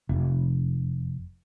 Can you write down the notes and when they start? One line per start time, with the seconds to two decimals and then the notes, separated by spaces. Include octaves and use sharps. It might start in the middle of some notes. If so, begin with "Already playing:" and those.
0.09 F1